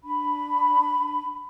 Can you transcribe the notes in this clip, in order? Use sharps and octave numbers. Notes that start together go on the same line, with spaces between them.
D4 B5